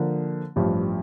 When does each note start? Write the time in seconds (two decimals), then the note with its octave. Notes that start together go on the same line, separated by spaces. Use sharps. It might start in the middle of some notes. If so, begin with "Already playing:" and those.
Already playing: D3 F3 A#3
0.56 A1 G2 F3